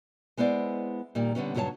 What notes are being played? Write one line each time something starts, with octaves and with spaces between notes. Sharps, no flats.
G#3 B3 E4 C5 D5
A#2 D#3 G3
D3 G3 B3 C#4
G2 C#3 F#3 G4 C#5 A5